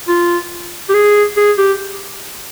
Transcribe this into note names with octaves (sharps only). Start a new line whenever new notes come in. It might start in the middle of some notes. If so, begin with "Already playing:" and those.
F4
G4
G#4
G#4
G4